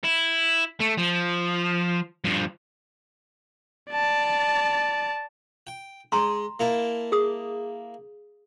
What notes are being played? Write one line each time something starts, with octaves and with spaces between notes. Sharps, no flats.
E4
A3
F3
G2 F3
D5 A5
G5
G#3 A#5 C6
A#3 E4 A5
G#4 D#6